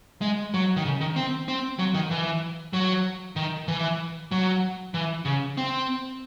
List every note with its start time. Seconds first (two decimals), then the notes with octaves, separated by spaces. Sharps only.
0.21 G#3
0.54 F#3
0.76 D#3
0.85 C#3
1.01 D#3
1.16 C4
1.48 C4
1.79 F#3
1.94 D#3
2.11 E3
2.73 F#3
3.36 D#3
3.68 E3
4.32 F#3
4.94 E3
5.25 C#3
5.57 C4